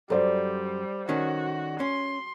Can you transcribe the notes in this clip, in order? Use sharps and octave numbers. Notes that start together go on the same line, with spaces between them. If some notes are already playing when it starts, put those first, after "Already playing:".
F#2 G3 A4 C5 D5
D#3 C#4 F#4
C#4 C6